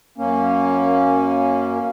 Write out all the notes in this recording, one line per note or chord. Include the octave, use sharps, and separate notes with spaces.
F#2 A#3 C#4